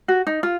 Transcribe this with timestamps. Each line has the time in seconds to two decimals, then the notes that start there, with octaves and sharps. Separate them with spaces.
0.08 F#4
0.27 D#4
0.43 F4